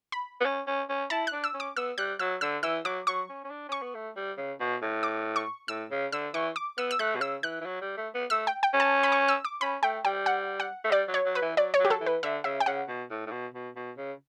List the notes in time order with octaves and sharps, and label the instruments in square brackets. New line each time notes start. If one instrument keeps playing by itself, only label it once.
[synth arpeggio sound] B5
[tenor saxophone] B3
C#4
C#4
C#4
[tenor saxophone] E4 [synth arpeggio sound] A5
[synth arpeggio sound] F#6
[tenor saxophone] D4
[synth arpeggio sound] E6
[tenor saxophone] C#4
[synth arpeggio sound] D6
[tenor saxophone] B3 [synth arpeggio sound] E6
[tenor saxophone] G3 [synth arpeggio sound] F#6
[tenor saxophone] F#3 [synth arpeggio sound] E6
[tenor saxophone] D3 [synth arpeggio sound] E6
[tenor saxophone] E3 [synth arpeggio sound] E6
[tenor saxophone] F#3 [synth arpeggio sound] D6
[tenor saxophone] F#3 [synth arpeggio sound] C#6
[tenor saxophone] C#4
C#4
D4
[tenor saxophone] C#4 [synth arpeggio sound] C#6
[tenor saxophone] B3
A3
G3
C#3
B2
A2
[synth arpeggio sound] D6
C#6
[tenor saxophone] A2 [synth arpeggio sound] E6
[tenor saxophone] C#3
[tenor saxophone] D3 [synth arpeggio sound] E6
[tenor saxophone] E3 [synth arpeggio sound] C#6
[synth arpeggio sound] D6
[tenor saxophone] B3 [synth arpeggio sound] E6
[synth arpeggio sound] E6
[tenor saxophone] A3 [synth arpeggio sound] F#6
[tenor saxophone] B2
[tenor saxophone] C#3 [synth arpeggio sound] E6
[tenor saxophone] E3 [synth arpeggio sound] F#6
[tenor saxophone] E3
F#3
G3
A3
B3
[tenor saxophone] A3 [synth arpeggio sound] E6
[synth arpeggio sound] G5
G5
[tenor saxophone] C#4
[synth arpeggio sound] A5
B5
C#6
E6
D6
[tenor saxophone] C#4 [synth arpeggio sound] B5
[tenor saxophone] A3 [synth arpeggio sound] G5
[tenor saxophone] G3 [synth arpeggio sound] G5
[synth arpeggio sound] F#5
F#5
[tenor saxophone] A3
[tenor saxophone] G3 [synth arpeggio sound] D5
[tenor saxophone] F#3
[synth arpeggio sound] C#5
[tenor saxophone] F#3
[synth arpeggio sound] B4
[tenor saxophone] E3
[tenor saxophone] F#3 [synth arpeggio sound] D5
[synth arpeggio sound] C#5
[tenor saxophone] F#3
[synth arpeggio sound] G4
A4
[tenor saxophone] E3
[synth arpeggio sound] B4
[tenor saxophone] D3 [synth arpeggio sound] E5
[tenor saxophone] C#3 [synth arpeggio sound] E5
[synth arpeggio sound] G5
[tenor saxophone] C#3 [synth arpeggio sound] F#5
[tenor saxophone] B2
A2
A2
B2
B2
B2
C#3